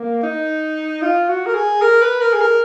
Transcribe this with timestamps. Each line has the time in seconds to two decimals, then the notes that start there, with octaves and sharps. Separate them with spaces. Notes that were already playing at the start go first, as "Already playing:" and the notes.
Already playing: A#3
0.23 D#4
1.02 F4
1.29 F#4
1.47 A#4
1.55 G#4
1.82 A#4
2.02 B4
2.21 A#4
2.33 G#4
2.41 A#4